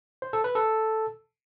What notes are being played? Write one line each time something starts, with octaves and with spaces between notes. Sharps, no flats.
C5
A4
B4
A4